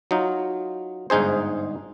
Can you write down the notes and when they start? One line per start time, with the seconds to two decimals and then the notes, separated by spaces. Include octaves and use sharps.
0.11 F#3 D#4 F4
1.10 G1 G#2 D#4 G#4 C5